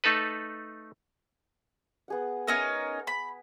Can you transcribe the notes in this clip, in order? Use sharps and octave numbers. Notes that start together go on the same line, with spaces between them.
A3 D#4 A4 B4
B3 G#4 F#5
C#4 D#4 A#4
B5